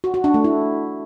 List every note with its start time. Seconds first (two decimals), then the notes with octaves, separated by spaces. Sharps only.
0.04 F#4
0.14 F#4
0.24 D4
0.34 A3
0.44 E4